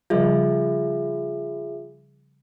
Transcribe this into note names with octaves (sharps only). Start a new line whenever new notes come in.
C#3 F3 G3 F4 G#4 E5